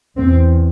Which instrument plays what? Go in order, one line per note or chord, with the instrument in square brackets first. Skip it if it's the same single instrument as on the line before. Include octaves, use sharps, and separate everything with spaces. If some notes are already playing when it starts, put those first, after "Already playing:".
[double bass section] E2 C3 C4